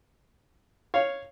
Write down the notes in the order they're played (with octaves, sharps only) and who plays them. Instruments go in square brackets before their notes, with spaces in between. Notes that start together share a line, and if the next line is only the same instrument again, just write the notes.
[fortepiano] C#5 F5